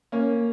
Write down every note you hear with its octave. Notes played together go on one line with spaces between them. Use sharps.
A#3 C#4